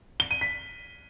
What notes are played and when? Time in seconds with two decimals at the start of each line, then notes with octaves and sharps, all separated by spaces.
0.20 G7
0.31 D#7
0.41 B6